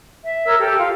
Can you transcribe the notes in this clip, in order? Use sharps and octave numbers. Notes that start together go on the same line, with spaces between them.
E5
A#4 C#5 E6
G4 A4
F4 F5